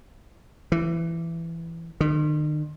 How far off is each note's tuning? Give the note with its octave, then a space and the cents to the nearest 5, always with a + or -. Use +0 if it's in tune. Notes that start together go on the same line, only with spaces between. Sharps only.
E3 +15
D#3 -45